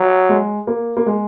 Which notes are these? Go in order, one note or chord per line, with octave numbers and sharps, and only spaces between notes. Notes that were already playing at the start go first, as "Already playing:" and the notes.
Already playing: F#3
G#3
A#3
A#3
G#3